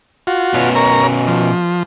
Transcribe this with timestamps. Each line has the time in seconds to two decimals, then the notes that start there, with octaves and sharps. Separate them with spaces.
0.27 F4 F#4
0.54 B2 B3 C#4
0.76 A#4 C#5 A#5
1.28 F3